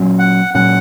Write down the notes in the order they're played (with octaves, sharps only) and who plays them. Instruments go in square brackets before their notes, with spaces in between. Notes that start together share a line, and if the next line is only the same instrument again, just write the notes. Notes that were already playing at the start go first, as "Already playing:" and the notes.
Already playing: [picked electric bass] A#2 F#3 C#4
[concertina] F#5
[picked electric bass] A#2 F#3 C#4 [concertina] F#5